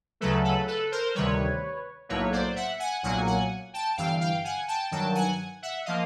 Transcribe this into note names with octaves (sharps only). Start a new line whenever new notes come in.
D2 C#3 F#3 A3 A4 B4
A4 B4
A4 B4
A#4 C5
D2 C3 D#3 G3 B4 C#5
B1 A2 F#3 A#3 B4 C#5
C5 D5
E5 F#5
F#5 G#5
B1 A#2 F#3 A#3 F#5 G#5
F#5 G#5
G5 A5
G1 G2 E3 F5 G5
F5 G5
F#5 G#5
G5 A5
G2 D#3 F#3 G5 A5
F#5 G#5
E5 F#5
F3 A#3 D#5 F5